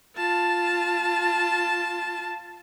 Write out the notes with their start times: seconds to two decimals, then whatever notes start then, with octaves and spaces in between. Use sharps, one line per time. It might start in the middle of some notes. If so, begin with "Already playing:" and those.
0.17 F4 A5